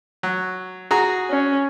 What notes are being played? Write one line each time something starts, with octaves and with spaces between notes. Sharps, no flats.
F#3
F#4 G#4 A#5
C#4